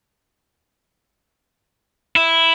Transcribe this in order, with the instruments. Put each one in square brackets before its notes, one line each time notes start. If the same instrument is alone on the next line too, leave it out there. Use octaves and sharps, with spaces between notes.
[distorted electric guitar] E4